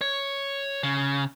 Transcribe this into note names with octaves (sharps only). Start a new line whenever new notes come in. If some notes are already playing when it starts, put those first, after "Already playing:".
C#5
C#3